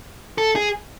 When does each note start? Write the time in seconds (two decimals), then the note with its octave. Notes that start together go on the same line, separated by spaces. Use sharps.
0.38 A4
0.56 G#4